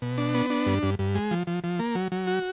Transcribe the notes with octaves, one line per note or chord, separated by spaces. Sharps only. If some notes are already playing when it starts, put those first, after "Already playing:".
B2
D4
B3
D4
G2
G2
G2
G#3
F3
F3
F3
A#3
F#3
F#3
F#4